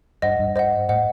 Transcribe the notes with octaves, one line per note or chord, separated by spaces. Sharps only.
G2 C5 D#5 F#5
G2
C5 D#5 F#5
A2 C5 D#5 F#5